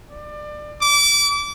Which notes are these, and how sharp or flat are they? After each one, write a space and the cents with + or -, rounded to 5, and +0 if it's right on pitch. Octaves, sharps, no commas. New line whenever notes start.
D5 +25
D6 -30